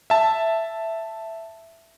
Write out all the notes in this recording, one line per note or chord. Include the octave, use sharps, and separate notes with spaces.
E5 A5